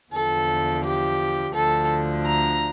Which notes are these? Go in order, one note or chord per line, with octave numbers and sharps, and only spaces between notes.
E2 D3 F3 A4
G4
D2 D3 F3 A4
A#5